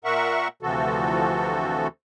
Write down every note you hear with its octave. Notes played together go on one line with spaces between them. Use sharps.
A#2 A#4 E5 F#5 C#6
D2 C3 E3 F3 F#4 A4